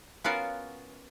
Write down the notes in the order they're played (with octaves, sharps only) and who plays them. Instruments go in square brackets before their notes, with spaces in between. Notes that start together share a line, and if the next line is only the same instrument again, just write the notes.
[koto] B3 C#4 F4 F#4 A#4 F5